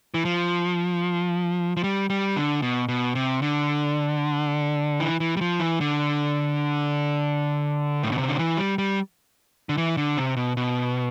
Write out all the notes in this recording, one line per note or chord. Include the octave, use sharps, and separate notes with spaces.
E3
F3
F3
G3
G3
D3
B2
B2
C3
D3
E3
E3
G3
F3
E3
D3
A2
B2
C3
D3
E3
G3
G3
D3
E3
D3
C3
B2
B2